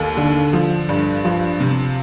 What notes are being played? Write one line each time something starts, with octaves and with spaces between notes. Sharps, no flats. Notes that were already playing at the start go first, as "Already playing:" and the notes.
Already playing: D#2 A4
D3
F3
G2
F3
C3